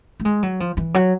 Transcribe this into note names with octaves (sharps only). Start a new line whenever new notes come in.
A3
G#3
F#3
F3
E3
F#3